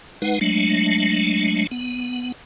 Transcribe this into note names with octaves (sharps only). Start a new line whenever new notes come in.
G#3 D#4 B4 F#5
F#3 G#3 A3 D4
B3